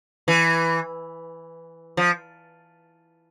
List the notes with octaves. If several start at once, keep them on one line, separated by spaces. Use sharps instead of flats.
E3
F3